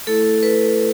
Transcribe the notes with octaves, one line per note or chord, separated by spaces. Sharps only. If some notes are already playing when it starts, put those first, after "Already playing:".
A3 E4 A4
B4